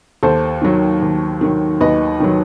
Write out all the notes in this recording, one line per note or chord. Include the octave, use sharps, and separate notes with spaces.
D#2 A4 C5
D#3 F#3
D#2
D#3 F#3
D#2 B4 D#5
D#3 F#3